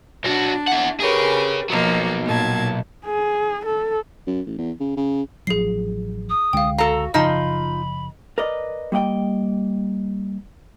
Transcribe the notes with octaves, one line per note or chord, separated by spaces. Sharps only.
B1 D4 F#4
E4 F#5
G4 G#4 A#4 B4 C#5
B2 F3 F#3 A#3
A#2 A5 G#6
G#4
A4
F#2
A1
E2
C#3
C#3
A1 F3 F#3 G#4 C7
D#6
C#2 D3 G#3 F5 G5
F#4 A4 F5 A#5
F#1 C#3 F3 D#4 F4 D#5 A5 B5
A#4 B4 D5 D#5
G3 A#3 D#5 F#5 G5